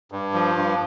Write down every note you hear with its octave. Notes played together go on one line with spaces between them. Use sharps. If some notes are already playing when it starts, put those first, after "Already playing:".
G2
F3
G2